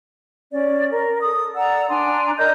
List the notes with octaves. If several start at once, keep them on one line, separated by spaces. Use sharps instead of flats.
C#4 D5
A#4
A4 D#6
D5 F#5 A#5 E6
D4 G#5 A#5 C6
A#4 D5 D#5 G6